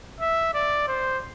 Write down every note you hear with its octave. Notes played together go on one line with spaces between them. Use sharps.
E5
D5
C5